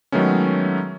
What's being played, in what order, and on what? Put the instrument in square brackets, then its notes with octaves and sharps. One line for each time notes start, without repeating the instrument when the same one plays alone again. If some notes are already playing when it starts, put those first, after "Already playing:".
[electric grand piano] D#3 F#3 G#3 A3 B3 C#4